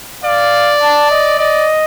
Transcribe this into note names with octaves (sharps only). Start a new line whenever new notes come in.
D5 F5
A5
D#5
D5 D#5